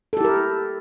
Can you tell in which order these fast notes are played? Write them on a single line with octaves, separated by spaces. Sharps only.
A4 G4 E4 A#4